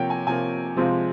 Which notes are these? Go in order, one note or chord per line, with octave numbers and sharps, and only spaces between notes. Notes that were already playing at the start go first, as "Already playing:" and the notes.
Already playing: C3 F3 A#3 C#5 G5
G#5
C3 F3 A#3 G#5
C3 F3 G#3 C4 F4